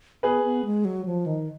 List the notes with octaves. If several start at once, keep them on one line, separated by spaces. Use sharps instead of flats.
B3 G#4 B4
B3
G#3
F#3
F3
D#3